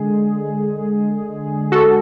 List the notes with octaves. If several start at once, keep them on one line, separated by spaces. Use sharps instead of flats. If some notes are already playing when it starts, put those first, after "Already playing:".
Already playing: D3 G#3 G#4
F#4 A4